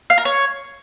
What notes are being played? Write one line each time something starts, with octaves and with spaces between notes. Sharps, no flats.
F5
A#4
C#5